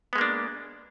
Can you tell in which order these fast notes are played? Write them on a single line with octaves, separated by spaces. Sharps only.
B3 G#3 A#3 D4